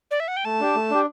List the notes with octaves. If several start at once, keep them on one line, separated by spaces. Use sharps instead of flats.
D5
E5
F#5
G5
A3 A5
D4 G4
A3
D4 G4